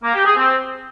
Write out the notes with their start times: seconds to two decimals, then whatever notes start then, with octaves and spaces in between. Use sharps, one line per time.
0.04 A#3
0.14 G4
0.25 G#4
0.36 C4